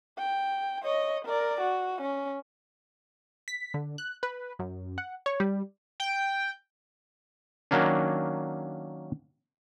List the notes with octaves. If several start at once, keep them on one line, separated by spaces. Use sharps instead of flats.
G5
C#5 D#5
A#4 D5
F#4
C#4
B6
D3
F#6
B4
F#2
F#5
C#5
G3
G5
D#3 F#3 A#3 C#4 D4